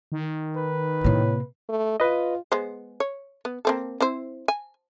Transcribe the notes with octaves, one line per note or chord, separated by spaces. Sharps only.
D#3
B4
A2 C3 A#3
A3
F4 B4 D#5
G#3 B3 C5
C#5
B3
A#3 C4 A4
C4 E4 C5
G#5